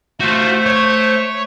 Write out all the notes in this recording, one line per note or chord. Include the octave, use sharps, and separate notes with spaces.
A3 F4 F#4 C5
C#5